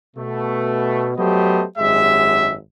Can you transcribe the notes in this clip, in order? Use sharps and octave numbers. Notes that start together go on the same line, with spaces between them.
B2 A3
F#3 A3 B3 G4 C5 D#5
G#1 F#2 G#3 G4 E5